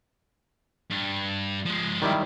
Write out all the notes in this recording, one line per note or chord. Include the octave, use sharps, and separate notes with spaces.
G2
F3 G#3
D#3 G3 E4